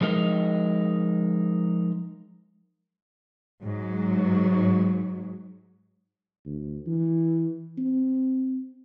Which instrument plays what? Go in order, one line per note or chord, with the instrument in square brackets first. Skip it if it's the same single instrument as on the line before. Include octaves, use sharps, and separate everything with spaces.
[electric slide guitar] F3 G#3 D#4 A#4 D#5
[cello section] G#2 F#3
[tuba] D2
E3
C4